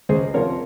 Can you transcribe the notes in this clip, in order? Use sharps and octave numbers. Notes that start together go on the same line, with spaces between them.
C#2 G#4 C5
C3 F3 A#4 C#5